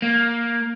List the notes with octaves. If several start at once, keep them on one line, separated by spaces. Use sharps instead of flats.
A#3